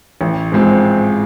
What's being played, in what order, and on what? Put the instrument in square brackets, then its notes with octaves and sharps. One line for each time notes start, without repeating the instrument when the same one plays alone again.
[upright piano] A1
G#2 F3 G#3 C4